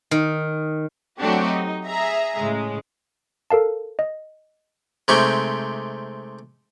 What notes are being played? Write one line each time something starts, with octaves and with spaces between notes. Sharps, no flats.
D#3
F#3 A3 C4 D4 F#4 G4
D#4
G#4 E5 A#5
A2 C#3 G#3
A4 A#4 F5 A5
D#5
C3 G#3 A3 D#4 G4 C#6